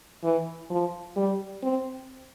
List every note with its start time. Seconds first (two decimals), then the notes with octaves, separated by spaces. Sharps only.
0.23 E3
0.70 F3
1.16 G3
1.63 C4